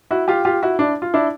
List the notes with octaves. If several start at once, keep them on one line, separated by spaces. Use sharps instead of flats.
E4 F#4
F4 G4
F4 G4
E4 F#4
D4 E4
F4
D4 E4